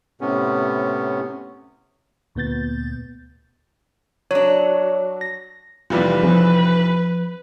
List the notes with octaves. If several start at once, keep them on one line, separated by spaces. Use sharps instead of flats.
A2 C3 B3 C#4
D2 A#2 B3 G6 A6
F#3 D4 C#5
A#6
F1 E3 G3 F4 B4 D5
F3 C4 G#4